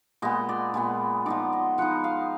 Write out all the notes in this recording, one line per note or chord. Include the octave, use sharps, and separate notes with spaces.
A#2 G#3 B3 D#5
D5
A#2 G#3 B3
F3 B3 D#4 D5
D#5
F3 B3 D#4 F#5
F5